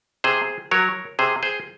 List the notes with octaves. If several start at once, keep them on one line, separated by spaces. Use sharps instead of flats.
C3 G#4 C5
F#3 A#4 C#5
C3 G#4 C5
G#4 C5